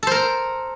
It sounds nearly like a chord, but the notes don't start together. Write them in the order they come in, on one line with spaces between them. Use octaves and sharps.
A4 C5 A#4